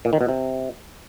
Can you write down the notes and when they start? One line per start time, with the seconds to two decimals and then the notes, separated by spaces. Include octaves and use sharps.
0.05 A#2
0.13 D#3
0.21 B2
0.29 C3